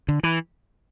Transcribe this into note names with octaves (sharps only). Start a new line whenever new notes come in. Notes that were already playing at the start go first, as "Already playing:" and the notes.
D3
E3